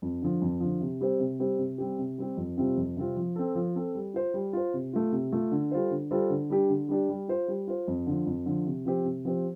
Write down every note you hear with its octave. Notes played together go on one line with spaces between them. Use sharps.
F2
D3 F3
F2
D3 F3
C3
G3 C4 G4 C5
C3
G3 C4 G4 C5
C3
G3 C4 G4
C3
G3 C4 G4
F2
C3 G3 C4 F4
F2
C3 G3 C4 F4
F3
C4 A4
F3
C4 A4
G3
F4 C5
G3
F4 C5
C3
A3 F4
C3
A3 F4
D3
G3 F4 A4 C5
D3
G3 F4 A4 C5
D3
G3 D4 G4
D3
G3 D4 G4
G3
F4 C5
G3
F4 C5
F2
D3 F3
F2
D3 F3
C3
F3 C4 G4 C5
C3
F3 C4 G4 C5